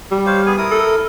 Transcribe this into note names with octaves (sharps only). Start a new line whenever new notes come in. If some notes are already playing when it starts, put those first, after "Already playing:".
G3
C5 C#5 F5
B3 G#4 G#5
E4 A#4 D#6
A4